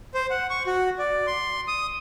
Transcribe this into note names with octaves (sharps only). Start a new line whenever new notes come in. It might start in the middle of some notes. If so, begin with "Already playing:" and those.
C5
F#5
C#6
F#4
D5
C6
D#6